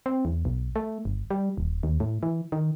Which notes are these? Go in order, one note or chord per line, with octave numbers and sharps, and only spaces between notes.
C4
E2
B1
A3
G1
G3
D#1
D#2
A2
E3
D#3